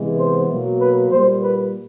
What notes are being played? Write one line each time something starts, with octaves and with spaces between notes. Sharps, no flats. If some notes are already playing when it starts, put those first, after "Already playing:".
Already playing: C3 E3 G#3 B3
C5
B2 F#3 A#3
B4
A#2 G3 A#3 C5
B4